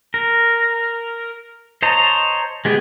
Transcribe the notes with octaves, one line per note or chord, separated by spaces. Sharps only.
A#4
C5 C#5 D#5 A5 A#5
G#3 B3 G4 G#4